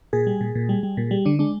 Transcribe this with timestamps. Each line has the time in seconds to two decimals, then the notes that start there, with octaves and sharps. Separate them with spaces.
0.13 A#2 G#4
0.27 G3
0.41 A#2
0.55 A#2
0.69 G3
0.83 G3
0.97 A#2
1.11 G3
1.25 D3 D4
1.39 G#3 D4